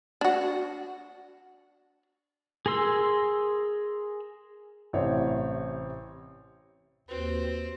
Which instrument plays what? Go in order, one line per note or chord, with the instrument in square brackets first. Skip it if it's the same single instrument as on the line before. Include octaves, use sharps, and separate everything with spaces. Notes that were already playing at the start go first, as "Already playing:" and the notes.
[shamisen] D4 F#4
[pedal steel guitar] G#4 A#4 C6 E6
[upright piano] A1 C3 E4 C5 C#5
[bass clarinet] D#2 [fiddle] C4 [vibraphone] F#4 B4